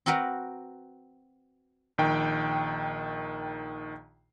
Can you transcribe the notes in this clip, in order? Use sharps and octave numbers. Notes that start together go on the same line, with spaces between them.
C4 F#4 A#4 B4 F#5
A#1 D#3 G5